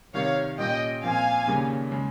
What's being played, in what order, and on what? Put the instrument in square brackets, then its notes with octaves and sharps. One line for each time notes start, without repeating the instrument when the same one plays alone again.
[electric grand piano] C3 D#3 G3 [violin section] C#5 F5
[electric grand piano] A#2 G3 C#4 [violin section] D#5 G5
[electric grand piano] A#2 F3 C4 [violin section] F5 G#5
[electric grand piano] D#2 C#3 G3 A#3 C#4
C#3 G#3